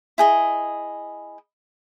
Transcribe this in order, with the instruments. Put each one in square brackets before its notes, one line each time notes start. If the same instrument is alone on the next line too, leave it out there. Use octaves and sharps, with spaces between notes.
[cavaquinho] E4 G#4 D#5